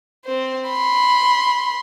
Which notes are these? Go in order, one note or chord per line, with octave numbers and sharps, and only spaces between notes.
C4 C5
B5 C6